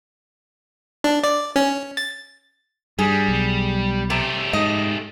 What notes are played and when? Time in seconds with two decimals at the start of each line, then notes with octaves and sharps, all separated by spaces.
1.04 D4
1.24 D5
1.56 C#4
1.97 A6
2.99 G2 G3 G#4
3.28 B1
4.10 C3 A3 G4
4.53 G#2 D#5